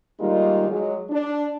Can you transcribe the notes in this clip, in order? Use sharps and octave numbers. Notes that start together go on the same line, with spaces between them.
D#3 G3 G#3 A#3 D#4 F4
F#3 G#3
D4